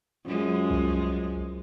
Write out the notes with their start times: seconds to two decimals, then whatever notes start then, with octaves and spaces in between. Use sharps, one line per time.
0.25 F#2 F3 G#3
0.70 C2